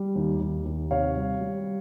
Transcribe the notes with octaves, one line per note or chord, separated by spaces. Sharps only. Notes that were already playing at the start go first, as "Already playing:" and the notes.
Already playing: G3
D#2
D#2
D#2
C3 C#5 F5
G3
G3